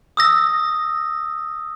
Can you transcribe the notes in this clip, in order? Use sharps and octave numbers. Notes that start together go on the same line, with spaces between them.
D#6 E6 A#6